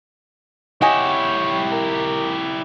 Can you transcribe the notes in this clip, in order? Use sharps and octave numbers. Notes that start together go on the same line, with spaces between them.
E4 G4 C#5 D#5 F#5 G#5
A#4